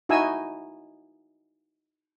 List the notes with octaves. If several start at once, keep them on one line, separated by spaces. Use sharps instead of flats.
D#4 E4 F#4 D#5 G#5 E6